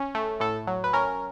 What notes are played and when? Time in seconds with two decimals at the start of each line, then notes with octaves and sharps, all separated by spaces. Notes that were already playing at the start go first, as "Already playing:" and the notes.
Already playing: C#4
0.15 A3
0.40 A2 A4
0.67 F#3
0.84 B4
0.93 C#4 A#4